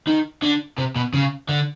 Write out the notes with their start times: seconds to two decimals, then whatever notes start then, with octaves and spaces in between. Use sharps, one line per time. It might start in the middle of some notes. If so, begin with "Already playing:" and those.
0.07 D#3
0.42 D3
0.78 C3
0.96 B2
1.13 C#3
1.49 D3